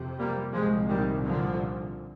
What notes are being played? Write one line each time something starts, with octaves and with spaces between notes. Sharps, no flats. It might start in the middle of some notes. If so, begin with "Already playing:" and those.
Already playing: F2 C3
G3 A#3
C2 A#2 F3 G#3
D#3 G3
D3 F3